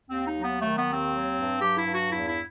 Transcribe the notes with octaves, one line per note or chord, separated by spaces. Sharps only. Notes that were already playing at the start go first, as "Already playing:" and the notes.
D#2 C4
D#4
F#3
B3
D#3 A3
B3
D#2
C4
F#3
G2
F#3 G4
E4
G2
F#4
E2 E4
E4